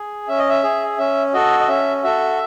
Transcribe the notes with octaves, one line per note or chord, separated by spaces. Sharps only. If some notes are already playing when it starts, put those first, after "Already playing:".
Already playing: G#4
C#4 E5
D#5
E5
G#4
C#4 E5
F#4 A4 D#5
D#5
C#4 E5
F#4 A4 E5